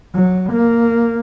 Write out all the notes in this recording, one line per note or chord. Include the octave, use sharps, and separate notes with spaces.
F#3
A#3